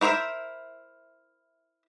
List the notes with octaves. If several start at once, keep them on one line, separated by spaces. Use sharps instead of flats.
E4 A#4 C5 D5 E5